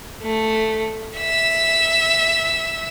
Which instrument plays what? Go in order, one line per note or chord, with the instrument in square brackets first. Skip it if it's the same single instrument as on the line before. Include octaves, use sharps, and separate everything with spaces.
[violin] A3
E5 E6